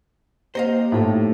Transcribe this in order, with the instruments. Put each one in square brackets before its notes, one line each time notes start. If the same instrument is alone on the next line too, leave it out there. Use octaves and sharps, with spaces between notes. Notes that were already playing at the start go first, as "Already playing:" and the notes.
[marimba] A#3 [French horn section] G4 [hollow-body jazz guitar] C5 D#5 F5
[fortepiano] A2 [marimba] D#4 A4 A5